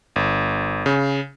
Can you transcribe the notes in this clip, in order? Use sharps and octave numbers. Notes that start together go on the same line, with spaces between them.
G1
C#3